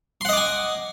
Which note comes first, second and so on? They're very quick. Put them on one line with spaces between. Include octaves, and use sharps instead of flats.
C6 F#5 D#5 D6 G#5